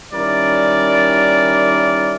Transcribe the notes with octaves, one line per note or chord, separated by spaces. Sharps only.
D#3 G3 C#4 E4 A#4 D5